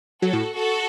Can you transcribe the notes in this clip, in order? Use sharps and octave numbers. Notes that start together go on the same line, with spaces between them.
F#3 F#4 A4
A2
F#4 A4